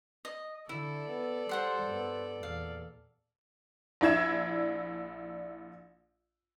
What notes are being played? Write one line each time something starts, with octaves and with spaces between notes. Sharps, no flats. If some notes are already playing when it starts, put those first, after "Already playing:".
D#5
D3 E4 A4 D5
B3
G3 C5 F#5 C6
G2 B3
E2 A#2 F5
A#1 D4 E4 E5 G#6 E7